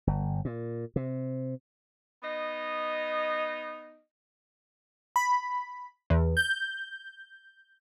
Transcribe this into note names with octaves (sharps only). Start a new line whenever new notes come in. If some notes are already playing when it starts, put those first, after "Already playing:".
G1
A#2
C3
B3 D#4 D#5
B5
E2
G6